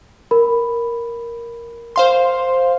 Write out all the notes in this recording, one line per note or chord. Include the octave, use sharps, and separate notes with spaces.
A#4 B5
C5 F5 C6